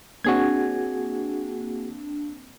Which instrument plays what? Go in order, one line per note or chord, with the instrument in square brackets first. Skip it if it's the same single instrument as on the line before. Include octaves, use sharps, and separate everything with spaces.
[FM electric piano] A#3 C4 D4 [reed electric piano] F#4 G#4 G#6